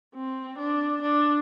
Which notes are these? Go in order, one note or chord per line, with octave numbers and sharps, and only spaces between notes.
C4
D4
D4